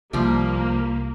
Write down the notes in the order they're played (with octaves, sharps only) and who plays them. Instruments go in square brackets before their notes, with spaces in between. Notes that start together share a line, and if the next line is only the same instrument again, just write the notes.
[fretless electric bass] C2 [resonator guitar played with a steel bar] F3 G3 [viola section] A#3